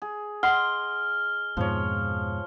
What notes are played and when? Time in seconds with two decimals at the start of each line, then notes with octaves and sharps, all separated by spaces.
0.02 G#4
0.43 D#5 F#5 C6 F6
1.57 F2 G#2 B2 F3 C#5